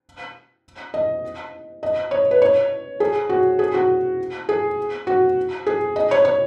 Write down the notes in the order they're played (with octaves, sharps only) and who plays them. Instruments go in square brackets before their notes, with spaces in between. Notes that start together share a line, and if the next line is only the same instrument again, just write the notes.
[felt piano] D#5
D#5
C#5
B4
C#5
G#4
F#4
G#4
F#4
G#4
F#4
G#4
D#5
C#5
C#5